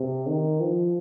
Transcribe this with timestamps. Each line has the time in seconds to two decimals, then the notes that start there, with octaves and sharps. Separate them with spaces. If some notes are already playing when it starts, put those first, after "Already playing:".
Already playing: C3
0.27 D#3
0.60 F3